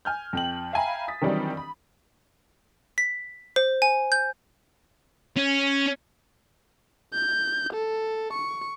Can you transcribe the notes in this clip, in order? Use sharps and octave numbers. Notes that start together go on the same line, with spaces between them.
G#5 F6 G6
F2 G5 F#7
E5 F5 G5 G#5 A#5 B5
D#6 A6 B6
D#3 E3 F#3 G3 C4 D4
B5
B6
C5
G#5
G6
C#4
G6
A4
C#6